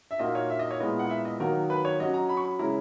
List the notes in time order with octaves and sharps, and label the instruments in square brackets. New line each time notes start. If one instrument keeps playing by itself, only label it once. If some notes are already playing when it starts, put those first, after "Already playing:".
[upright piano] E5
[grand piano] A#2 A#3 D#4 F#4 [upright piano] D#5
[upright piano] C#5
E5
D#5
C#5
[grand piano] A#2 G#3 B3 E4 [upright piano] D#5
[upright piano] F#5
E5
D#5
[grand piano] D#3 F#3 A#3 D#4 F#4 [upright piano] A#4
[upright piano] B4
C#5
[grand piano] F#3 C#4 F#4 [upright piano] D#5
[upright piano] A#5
B5
C#6
B5
[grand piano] C#3 G#3 C#4 E4 [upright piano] A#5